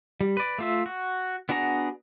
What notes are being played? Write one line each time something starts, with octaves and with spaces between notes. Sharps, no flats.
G3
B4 D5
A3 F4 E5
F#4
B3 D4 F#4 G#4 A#5